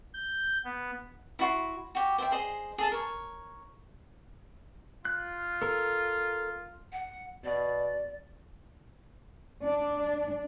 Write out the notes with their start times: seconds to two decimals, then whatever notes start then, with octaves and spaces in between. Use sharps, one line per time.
0.14 G6
0.64 B3
1.39 E4 F#4 C6
1.95 F#4 G4
2.18 C5 E5 G5
2.32 G#4 C5 D#5
2.78 G#4 A4 A5
2.92 A#4 C#5
5.05 F4 F#6
5.62 A4 A#4
6.92 F#5
7.44 B2 D5
9.63 D4